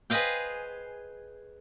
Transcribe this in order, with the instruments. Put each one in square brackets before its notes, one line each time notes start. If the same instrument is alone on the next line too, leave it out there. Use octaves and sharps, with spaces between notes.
[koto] G#4 B4 C5 D#5 F5 G5